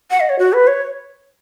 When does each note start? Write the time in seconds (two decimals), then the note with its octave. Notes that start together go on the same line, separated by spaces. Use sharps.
0.11 F#5
0.20 D#5
0.29 C#5
0.39 F#4
0.53 B4
0.67 C#5